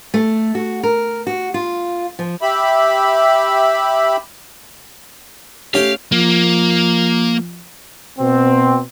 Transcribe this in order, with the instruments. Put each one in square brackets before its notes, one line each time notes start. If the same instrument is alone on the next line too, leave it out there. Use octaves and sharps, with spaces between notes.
[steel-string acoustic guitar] A3
F#4
A#4
F#4
F4
F3
[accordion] G4 E5 B5
[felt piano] A3 C#4 [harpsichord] G4 G5 [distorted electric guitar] F5
[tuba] F3 [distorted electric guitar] A#3
[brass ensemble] B2 C4